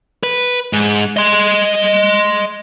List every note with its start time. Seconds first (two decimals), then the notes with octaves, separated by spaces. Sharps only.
0.23 B4
0.73 G#2
1.17 D#5 C6